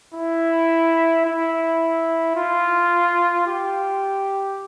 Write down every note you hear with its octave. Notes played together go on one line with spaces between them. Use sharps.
E4
E4
F4
G4